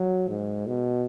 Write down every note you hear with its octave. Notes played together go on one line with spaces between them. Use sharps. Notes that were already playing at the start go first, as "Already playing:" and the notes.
Already playing: F#3
G#2
B2